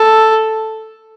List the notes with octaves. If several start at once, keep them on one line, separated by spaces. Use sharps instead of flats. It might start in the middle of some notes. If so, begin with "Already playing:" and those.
Already playing: A4